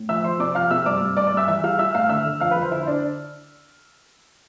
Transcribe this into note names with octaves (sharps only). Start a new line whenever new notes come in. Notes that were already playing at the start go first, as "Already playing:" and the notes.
Already playing: A2
F3 E5 E6
F3 C5 C6
C3 D5 D6
F2 F5 F6
C3 E5 E6
G2 D5 D6
G2
G2 D5 D6
D5 D6
G2 E5 E6
E3 E5 E6
G3 F5 F6
G3 E5 E6
A2 F5 F6
D3 E5 E6
D3
F2 F5 F6
B4 B5
F2
C5
D3 E4 E5
C5
D4 D5